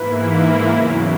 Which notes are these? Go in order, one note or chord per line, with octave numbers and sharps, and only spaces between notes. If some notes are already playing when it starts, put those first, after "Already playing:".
Already playing: G#2 E3 A#3 E4 B4
E2 C#3 F#3